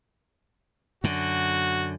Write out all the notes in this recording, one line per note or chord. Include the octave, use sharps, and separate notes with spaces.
F#2 D3 F#4